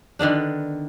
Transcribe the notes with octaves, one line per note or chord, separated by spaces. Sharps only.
D3 D#3 B3 D4